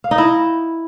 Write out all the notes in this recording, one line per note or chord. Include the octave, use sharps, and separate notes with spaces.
F5
D#4
E4